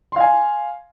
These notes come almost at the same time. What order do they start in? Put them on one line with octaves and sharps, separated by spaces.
C6 F5 G#5